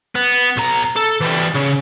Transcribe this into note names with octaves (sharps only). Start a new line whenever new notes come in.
B3
B1 A#5
A4
E3 G3
C#3